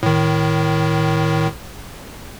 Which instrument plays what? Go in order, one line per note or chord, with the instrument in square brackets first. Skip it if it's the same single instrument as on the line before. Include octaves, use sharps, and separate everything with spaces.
[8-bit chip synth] A2 D#3